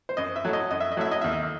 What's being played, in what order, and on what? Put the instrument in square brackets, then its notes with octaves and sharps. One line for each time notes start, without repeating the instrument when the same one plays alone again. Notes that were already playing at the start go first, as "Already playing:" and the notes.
[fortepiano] C5
F#2 D#5
E5
F#3 A3 E4
D#5
F#2 D#5
E5
D#5
F#3 A3 E4 E5
D#5
D#2 E5
D#5